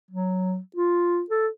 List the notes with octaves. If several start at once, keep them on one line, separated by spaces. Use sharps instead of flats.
F#3
F4
A4